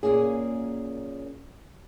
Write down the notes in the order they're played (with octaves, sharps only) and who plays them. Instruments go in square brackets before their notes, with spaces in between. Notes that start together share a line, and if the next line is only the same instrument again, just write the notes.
[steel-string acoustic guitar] F#2 A#2 A#3 C#4 G#4